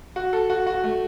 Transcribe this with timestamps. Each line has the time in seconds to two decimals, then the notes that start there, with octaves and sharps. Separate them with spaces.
0.16 F#4
0.33 A4
0.50 F#4
0.67 F#4
0.84 A3